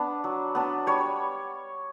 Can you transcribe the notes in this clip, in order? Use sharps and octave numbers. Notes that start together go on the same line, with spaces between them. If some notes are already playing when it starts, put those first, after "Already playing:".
Already playing: B3 D4
F#3
B3 D4
G3 C#5